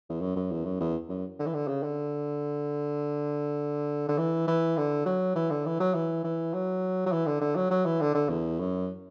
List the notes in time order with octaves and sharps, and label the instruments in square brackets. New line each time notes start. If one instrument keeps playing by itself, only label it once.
[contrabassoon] E2
F#2
F#2
E2
F#2
E2
F#2
D3
E3
D3
C#3
D3
D3
E3
E3
D3
F#3
E3
D3
E3
F#3
E3
E3
F#3
F#3
E3
D3
D3
F#3
F#3
E3
D3
D3
E2
F#2